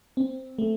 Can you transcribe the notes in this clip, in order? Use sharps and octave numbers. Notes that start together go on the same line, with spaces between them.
C4
A3